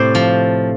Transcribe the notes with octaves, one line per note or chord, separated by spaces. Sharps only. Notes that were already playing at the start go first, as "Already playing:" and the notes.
Already playing: A2 C3 C5 D5
F3